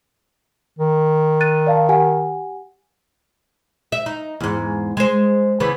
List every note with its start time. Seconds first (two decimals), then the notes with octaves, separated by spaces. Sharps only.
0.79 D#3
1.40 F#6 A6 D#7
1.67 D5 F5 A5
1.89 G4 F#5 G#5
3.92 E5
4.06 D#4
4.40 E2 G#2
4.97 G#3 C5
5.60 C#3 E3 B3